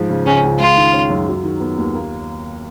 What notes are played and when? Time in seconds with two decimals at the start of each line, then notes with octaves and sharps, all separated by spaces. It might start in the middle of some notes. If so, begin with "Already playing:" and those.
Already playing: G#2 F3
0.09 C#3
0.26 C#2 C#4
0.43 C#2
0.59 G#3 F4
0.76 D#3
0.93 C#4
1.10 F#2
1.27 F#3
1.43 D#3
1.60 B3
1.78 D#2
1.95 A#3